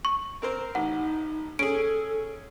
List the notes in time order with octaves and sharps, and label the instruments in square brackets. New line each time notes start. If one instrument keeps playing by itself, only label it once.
[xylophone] C#6
[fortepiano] C4 A#4 C5
[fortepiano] A1 [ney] D#4 [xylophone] F#5
[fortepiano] C#4 G#4 [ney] A4 [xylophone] D7